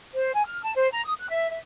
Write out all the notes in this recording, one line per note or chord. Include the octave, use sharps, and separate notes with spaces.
C5
G#5
F6
A5
C5
A#5
D#6
F#6
E5
E5